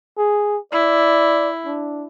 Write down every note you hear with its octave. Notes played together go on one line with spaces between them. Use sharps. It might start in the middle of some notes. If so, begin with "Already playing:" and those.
G#4
E4 D5
D4